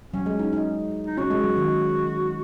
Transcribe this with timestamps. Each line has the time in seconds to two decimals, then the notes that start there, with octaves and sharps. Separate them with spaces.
0.13 F#3 C#4
0.26 G#3
0.39 D#4
0.53 D#4
1.07 D#4
1.17 C#4 F#4
1.30 G#3
1.44 F#3
1.57 D#3